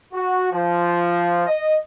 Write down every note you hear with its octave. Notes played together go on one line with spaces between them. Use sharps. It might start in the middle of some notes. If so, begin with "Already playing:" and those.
F#4
F3
D#5